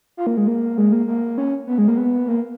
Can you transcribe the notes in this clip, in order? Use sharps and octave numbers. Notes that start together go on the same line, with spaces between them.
F4
A#3
G#3
A#3
G#3
A#3
A#3
C#4
B3
G#3
A#3
B3
A#3